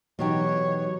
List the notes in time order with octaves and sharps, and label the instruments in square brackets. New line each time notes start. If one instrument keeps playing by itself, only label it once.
[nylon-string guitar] B2 F#3 G4 [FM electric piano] E3 D#4 [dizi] C#5